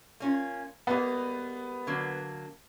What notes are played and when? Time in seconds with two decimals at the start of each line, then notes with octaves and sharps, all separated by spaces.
0.20 A#3 C#4 F4
0.87 G3 G#3 A#3 B3 B4
1.87 D3 F#3 A#3